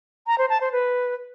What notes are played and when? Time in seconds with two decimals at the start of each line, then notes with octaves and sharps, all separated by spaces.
0.27 A#5
0.38 C5
0.50 A5
0.61 C5
0.72 B4